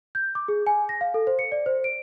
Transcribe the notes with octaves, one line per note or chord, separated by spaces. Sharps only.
G6
D6
G#4
G#5
A#6
F5
A4
C5
C#7
D5
C5
D7